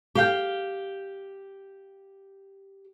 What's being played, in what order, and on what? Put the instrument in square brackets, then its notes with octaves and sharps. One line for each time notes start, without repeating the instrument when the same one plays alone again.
[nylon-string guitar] G4 F5 G5